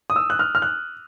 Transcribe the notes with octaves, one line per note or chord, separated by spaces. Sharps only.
D#6
E6
F#6
F6
F6
F#6